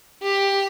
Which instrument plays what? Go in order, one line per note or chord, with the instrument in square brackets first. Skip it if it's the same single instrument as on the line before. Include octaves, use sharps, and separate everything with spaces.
[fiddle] G4